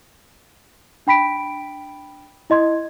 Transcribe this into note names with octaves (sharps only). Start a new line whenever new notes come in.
D4 G5 B5 B6 D7
E4 D#5 C6 G#6